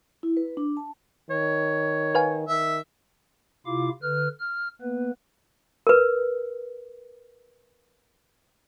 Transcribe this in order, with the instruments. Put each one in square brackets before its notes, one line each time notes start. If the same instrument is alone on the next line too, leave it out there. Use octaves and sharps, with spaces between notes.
[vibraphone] E4
B4
D4
A5
[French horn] D#3 [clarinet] C#5
[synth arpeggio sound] B4 F5 G#5
[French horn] D#3 [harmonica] E5
[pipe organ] C3 E4 F4 F5 D6
D3 B4 F6
F6
A#3 B3 B4
[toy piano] A#4 B4